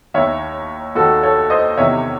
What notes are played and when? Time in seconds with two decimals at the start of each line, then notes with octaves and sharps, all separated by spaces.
0.14 D#2 D#3 C#5 E5
0.95 D#2 D#3 F#4 A4
1.23 A4 C#5
1.50 C5 D#5
1.77 E2 C3 D#3 C#5 E5